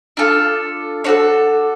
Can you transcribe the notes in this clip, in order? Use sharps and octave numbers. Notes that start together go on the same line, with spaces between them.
D4 F4 A4
D4 F#4 A4 C#5